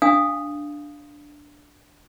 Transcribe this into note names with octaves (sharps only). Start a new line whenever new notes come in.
D4 F5 G#5 D#6